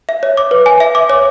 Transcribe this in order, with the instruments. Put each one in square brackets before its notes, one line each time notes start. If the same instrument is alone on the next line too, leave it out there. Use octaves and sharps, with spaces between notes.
[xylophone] E5
C#5
D6
B4
G#5
E5
D6
C#5